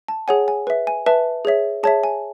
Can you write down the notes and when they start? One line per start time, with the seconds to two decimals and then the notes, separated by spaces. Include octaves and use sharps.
0.08 A5
0.28 G#4 C#5 F#5 G#5
0.48 G#5
0.67 B4 E5
0.87 G#5
1.06 B4 E5 A5
1.45 G#4 C#5 E5
1.83 G#4 C#5 E5 A5
2.04 G#5